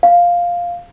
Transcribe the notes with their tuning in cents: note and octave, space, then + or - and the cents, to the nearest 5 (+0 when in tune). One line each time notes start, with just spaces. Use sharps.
F5 +5